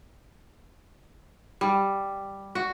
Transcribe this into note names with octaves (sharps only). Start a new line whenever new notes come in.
G3
F#4